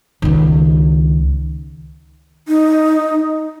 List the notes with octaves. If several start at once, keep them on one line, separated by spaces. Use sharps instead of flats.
C#2 D#3
D#4